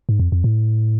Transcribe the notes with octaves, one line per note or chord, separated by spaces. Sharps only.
G#2
F2
F2
A2